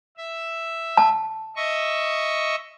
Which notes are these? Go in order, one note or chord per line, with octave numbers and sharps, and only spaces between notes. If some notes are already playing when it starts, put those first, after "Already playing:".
E5
A5
D#5 E5 C#6